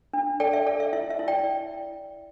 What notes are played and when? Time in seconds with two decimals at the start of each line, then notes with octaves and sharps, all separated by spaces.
0.13 D4
0.40 A4 D5 G5
0.53 E5
0.66 A4 D5
0.80 E5
0.93 E4 E5
1.10 E5
1.19 E4
1.28 D5 G5